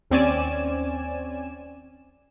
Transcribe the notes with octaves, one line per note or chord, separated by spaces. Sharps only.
D#2 C4 C#4 D5 G#5 E7